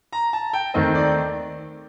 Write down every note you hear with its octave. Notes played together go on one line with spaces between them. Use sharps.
A#5
A5
G5
D#2 D#3 A3 C4 D#5
D5